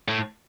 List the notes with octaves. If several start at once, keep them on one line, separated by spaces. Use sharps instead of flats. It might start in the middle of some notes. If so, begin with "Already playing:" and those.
A2